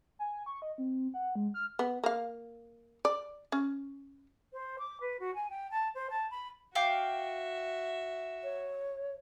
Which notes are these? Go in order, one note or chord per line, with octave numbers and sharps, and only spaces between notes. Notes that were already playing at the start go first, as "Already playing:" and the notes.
G#5
C#6
D#5
C4
F#5
G#3
F6
B3
A#3 F5
D5
C#4
C5
D6
B4
F#4
G#5
G5
A5
C5
A5
B5
F#4 E5 F5 G5 D6
C#5